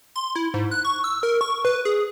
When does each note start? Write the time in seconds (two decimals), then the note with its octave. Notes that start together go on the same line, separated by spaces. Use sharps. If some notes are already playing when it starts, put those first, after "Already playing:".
0.16 C6
0.36 E4
0.54 G#2
0.71 F#6
0.85 C#6
1.04 E6
1.23 A#4
1.41 C#6
1.65 B4
1.85 G#4